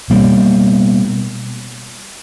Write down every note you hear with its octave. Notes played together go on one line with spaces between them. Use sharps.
B2 G3 A#3